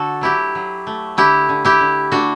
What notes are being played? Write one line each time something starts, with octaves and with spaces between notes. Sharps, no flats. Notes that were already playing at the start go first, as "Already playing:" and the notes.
Already playing: D3 F#4 A4
F#3 E4 G4
F#3
A3
D3 E4 G4
D3
E4 G4
D3
A3 D4 F#4